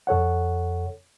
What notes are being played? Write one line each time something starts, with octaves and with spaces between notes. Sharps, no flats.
F2 A4 C#5 F#5